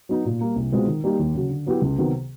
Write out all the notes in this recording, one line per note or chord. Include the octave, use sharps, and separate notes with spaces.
F#3 B3 D#4
A#2
G3 A#3
C2
B2 G#3 C4 F4
D#3
G3 A#3 D#4 G4
D#2
C#3 F#3
D3
F#3 B3 E4 G4
C#2
C3 D#3 F#3 B3